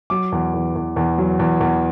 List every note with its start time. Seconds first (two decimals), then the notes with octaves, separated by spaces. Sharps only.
0.10 F#3 D6
0.32 E2
0.54 E2
0.75 E2
0.96 E2
1.18 F#3
1.39 E2
1.60 E2